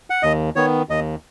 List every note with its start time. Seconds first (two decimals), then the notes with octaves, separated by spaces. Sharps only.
0.10 F#5
0.23 D#2 D#5
0.56 D#3 B3 C#5
0.89 D#2 D#5